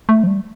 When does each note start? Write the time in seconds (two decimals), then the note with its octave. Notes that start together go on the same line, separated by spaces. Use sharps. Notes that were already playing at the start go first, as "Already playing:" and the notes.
0.09 A3
0.24 F3
0.27 G3